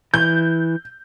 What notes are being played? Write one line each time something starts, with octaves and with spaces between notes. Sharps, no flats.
E3 G6